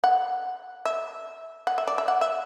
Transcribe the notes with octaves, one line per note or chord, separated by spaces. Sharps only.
F#5
E5
F#5
E5
D5
E5
F#5
E5